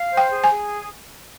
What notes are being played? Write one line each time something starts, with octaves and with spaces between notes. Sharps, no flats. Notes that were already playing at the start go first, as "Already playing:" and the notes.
Already playing: F5
C5
G5
G#4
G#5
G#4